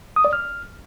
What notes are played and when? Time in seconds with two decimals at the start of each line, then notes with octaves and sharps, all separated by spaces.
0.16 D#6
0.25 D5
0.33 F6